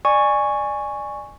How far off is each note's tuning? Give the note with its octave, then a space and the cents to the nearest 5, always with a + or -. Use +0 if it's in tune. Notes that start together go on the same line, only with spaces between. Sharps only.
D5 +25 G#5 -5 C#6 +0